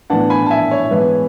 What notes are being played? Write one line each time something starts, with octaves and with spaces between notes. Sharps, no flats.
A2 E3 B3 D4 F#5 A5
G#5 B5
A5
E5 G#5
C#5
G#2 E3 B3 E4 B4